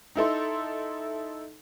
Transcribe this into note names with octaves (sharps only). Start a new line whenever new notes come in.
D#4 E4 A4 C6